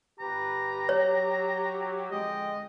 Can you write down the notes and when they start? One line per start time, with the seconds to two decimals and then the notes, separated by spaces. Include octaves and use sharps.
0.20 G1 G4 B4 A#5
0.89 F#3 C#5
2.12 F2 D3 G#3 D#5 G5